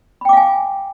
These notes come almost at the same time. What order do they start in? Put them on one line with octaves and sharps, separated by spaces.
B5 G5 D6 F5 G#5